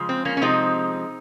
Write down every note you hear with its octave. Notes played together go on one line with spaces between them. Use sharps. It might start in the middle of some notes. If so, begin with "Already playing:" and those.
Already playing: C#3 F3 G#3
C4
A#3 C#4
C#4
C3 F3 G#3 C4 D#4